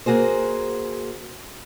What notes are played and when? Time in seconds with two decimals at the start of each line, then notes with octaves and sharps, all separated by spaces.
0.06 A#3 F#4 G#4 C5